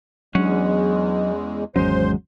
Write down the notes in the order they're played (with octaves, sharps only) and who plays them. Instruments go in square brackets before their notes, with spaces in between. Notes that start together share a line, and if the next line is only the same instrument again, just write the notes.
[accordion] E2 G#3 [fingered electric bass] F#3 D4 [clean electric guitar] C#4 F#5
[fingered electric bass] G#1 E2 C#4 [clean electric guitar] F#3 G#3 [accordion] C5 C6